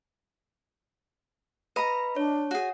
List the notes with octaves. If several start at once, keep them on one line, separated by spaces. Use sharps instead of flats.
B4 D#5 A#5 B5
D4 C#5
F#4 G#4